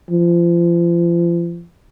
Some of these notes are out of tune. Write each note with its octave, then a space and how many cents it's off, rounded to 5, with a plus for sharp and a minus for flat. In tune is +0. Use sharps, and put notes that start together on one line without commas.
F3 -35